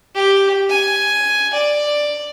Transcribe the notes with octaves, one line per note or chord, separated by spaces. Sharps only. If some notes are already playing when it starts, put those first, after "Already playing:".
G4
G#5
D5